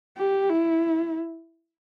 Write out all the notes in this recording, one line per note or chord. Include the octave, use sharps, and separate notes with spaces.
G4
E4